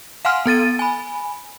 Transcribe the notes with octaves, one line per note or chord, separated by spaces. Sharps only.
F5 F#5 G#5 C6 F6
B3 A4 A6 D#7
G#5 B5